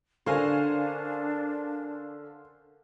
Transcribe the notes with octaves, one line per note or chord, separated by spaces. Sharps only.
D3 C#4 D4 A#4 C5 F5 G#5